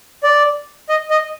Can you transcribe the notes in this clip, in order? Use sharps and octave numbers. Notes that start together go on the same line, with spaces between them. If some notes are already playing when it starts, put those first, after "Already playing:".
D5
D#5
D#5